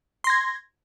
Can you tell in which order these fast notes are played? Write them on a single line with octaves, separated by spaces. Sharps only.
C6 A#6 G#6